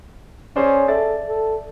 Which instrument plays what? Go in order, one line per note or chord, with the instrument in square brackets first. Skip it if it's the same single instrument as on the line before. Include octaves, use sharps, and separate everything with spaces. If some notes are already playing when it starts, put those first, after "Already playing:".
[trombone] C#4 [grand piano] G#4 C5 D5
[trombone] A4 [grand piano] D5 E5 A6
[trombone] A4